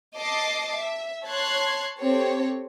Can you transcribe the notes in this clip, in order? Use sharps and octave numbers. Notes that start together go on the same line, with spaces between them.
D#5 A5 D6 A6 C7
E5
C#5 A5 C6 F#6 G#6
C4 G4 A4 C#5